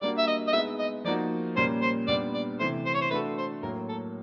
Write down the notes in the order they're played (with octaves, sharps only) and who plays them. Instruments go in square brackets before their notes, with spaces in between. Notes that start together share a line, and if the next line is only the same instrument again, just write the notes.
[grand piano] G3 A#3 D4 F#4 [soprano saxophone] D5
[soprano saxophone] E5
D#5
D#5
[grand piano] G#3 B3 D#4 [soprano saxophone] E5
[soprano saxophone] D#5
[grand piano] F3 A#3 D#4 F#4 [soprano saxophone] D5
[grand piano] A#2 G3 A#3 C#4 [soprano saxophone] C5
[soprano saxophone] C5
[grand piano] A#2 G3 B3 D4 [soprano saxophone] D5
[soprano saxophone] D5
[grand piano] C3 E3 A3 [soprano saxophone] C5
[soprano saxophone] C5
C#5
C5
[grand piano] A3 D4 F#4 A4 [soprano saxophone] B4
[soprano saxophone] C5
[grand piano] A2 F#3 A#3 [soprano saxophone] A#4
[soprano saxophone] A4